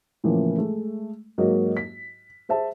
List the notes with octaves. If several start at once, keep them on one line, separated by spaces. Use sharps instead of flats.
A2 C#3 E3 F3 A#3
G#3 A3
G#2 F#3 A#3 F#4 D#5
B6
G#4 C5 E5 A5